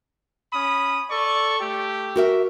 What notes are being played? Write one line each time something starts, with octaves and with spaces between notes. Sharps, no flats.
C#4 B5 D#6
A4 D5 C#6
A3 G4
F#4 A#4 E5